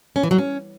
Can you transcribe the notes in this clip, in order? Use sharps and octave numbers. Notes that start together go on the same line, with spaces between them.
C#4
E3
F#3
C#4